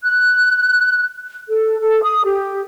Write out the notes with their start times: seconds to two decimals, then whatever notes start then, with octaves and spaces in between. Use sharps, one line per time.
0.03 F#6
1.49 A4
1.81 A4
2.03 D#6
2.24 G4